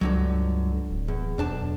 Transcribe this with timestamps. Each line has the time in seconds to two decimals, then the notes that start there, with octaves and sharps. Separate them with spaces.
0.01 C#2 G2 D3 F#3
0.90 D1
1.08 E2
1.38 B1 E2 D4 A5